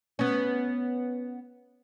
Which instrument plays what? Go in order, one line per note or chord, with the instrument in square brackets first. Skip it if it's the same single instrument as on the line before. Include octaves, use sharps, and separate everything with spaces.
[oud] B3 C#4